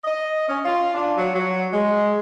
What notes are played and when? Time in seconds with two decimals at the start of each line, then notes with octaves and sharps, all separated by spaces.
0.04 D#5
0.47 C#4
0.65 F4
0.94 D4
1.17 F#3
1.34 F#3
1.72 G#3